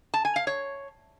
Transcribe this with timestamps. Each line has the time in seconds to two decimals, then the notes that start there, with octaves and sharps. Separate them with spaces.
0.14 A5
0.25 G#5
0.36 F5
0.47 C#5